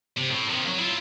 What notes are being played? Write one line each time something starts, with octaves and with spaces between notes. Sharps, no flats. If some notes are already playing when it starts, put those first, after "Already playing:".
C3
A2
C3 D#3
F#3
E4 F4